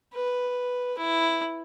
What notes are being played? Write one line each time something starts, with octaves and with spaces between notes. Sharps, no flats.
B4
E4